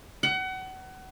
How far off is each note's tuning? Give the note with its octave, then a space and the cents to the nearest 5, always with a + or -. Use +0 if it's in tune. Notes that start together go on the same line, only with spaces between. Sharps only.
F#5 +30